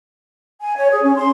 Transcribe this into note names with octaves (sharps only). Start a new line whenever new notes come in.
G#5
C#5
G#4
C#4
C6